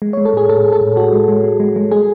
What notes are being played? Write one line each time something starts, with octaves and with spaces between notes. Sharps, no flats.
G#3
G#3 C#5
A4
A2 G#4
A2 A4
A2
A4
A2
A2 F#4
G#3
G#3
G#3
G#3
G#3
G#3 G#4